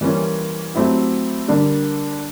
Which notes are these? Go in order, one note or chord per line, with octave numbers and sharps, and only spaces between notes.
E3 G3 A#3 C#4 F4
F#3 A3 C4 E4 G4
D3 G3 A#3